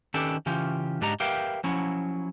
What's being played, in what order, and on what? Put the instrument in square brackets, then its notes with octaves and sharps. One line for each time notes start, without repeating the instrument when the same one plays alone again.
[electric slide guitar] D#3 C#4 D4 G4 A4 B4
C#3 E3 C#4 F4 G4
G#2 D4 G4 D#5 A#5
G4 A#4 B4 E5 F5 G5
F3 F#3 C#4 E4